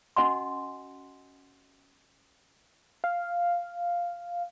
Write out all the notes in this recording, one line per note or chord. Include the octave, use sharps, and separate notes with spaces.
C#4 F#4 D#5 F#5 G#5 C6
F5